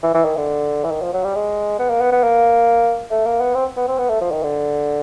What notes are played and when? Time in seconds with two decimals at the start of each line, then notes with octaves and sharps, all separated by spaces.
0.03 E3
0.14 E3
0.25 D#3
0.37 D3
0.84 E3
0.91 D#3
1.02 F3
1.13 F#3
1.24 G3
1.35 G#3
1.79 B3
1.90 A#3
2.01 B3
2.12 B3
2.23 A#3
3.11 A3
3.25 A#3
3.40 B3
3.55 C4
3.77 B3
3.88 C4
3.98 B3
4.09 A3
4.21 F3
4.31 D#3
4.43 D3